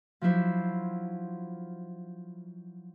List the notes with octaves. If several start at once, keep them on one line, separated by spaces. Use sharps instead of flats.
F3 F#3 D4 E4 C5